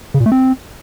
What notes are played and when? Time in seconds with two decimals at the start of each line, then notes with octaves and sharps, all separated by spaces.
0.14 C#3
0.20 A#2
0.26 A3
0.32 C4